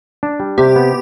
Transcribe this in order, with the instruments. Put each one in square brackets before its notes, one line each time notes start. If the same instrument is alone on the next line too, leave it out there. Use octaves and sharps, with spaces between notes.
[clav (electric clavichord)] D4
G3
[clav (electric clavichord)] C3 [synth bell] G4
[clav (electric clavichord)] B3